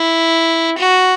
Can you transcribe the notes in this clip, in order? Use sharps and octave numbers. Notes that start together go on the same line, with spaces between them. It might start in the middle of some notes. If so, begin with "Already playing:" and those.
Already playing: E4
F#4